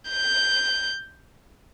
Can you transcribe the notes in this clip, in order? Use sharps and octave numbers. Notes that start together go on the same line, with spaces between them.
G6